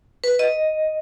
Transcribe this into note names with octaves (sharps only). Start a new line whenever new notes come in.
B4
D#5